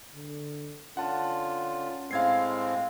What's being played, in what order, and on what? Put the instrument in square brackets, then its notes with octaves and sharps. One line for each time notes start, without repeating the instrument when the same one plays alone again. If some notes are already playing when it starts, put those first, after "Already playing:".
[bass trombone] D3
[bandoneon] D3 F4 [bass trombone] C#4 [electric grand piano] F#5 A5
[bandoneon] A2 G#3 C4 [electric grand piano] F5 G#6 C7